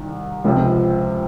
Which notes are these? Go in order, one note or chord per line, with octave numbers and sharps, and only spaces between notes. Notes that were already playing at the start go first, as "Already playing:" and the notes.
Already playing: C2 D#3
C#2 C3 F3